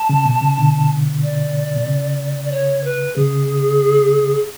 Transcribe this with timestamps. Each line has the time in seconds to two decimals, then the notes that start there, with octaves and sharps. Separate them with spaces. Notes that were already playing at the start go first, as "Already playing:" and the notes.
Already playing: A5
0.09 C#3
0.25 B2
0.41 C#3
0.58 B2 D3
1.23 D5
1.76 B2
1.87 C#3
2.44 D5
2.52 C#5
2.84 B4
3.16 C#3 G#4